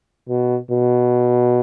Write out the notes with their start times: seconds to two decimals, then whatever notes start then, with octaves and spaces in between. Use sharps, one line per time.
0.29 B2
0.71 B2